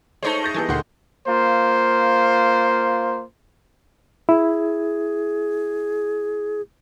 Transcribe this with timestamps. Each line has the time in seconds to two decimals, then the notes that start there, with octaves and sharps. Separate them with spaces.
0.23 G#3 A3 D#4 C5 C#5 A5
0.43 C#6 G6 A#6
0.54 E3 B3 G4 A4 G#5
0.69 D2 A#2 D#3 F#5 C6
1.28 A#3 F4 C5
4.29 E4 G#4